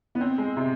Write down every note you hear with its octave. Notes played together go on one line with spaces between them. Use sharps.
B3
C4
G#3
C3